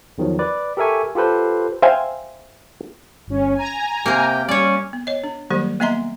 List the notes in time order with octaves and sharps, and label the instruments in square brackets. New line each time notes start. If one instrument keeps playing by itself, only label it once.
[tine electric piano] E2 D#3 F3 F#3
B4 D5
G4 A4 A#4 E5 G#5 C#6
F4 G4 A4 B4 C5
[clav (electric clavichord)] C5 E5 F5 G5 G#5
[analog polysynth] G1 C#4
G#5 A#5
[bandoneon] C3 G5 [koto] A#3 A#4
[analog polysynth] G3 [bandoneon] C#4 [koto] C#5 D5
[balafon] B3
C#5 D#5
D4
D#3 F#3 G3 A#3 G4 C5
A#3 B3 D#5 E5 A#5 C6